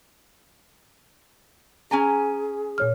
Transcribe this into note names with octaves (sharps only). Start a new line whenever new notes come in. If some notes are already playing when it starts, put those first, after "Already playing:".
C#4 G#4 G#5 A#5
A#2 C#5 F6